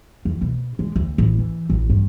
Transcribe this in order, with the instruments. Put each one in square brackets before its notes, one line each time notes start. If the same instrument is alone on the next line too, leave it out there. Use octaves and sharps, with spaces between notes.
[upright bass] F2
B2
G#3
D2
A1
E3
A1
G2